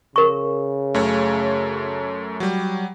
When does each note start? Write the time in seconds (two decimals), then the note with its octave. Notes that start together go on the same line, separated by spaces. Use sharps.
0.16 C#3 A#4 C#6
0.94 F#2 A3 C#5
2.40 F#3 G3